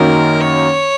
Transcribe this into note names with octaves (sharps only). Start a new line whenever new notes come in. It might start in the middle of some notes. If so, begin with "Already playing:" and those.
Already playing: F#2 D#3 F#3 A#3 D#4 A#4
C#5